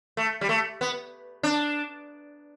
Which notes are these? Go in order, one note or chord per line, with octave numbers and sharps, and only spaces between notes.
A3
G3
A3
B3
D4